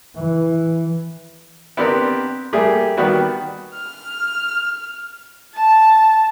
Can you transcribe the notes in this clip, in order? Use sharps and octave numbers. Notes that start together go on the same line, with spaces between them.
E3
B3 C4 D4 G4 A#4
G3 A3 A#3 G4 G#4
D#3 G3 B3 F#4
F6
A5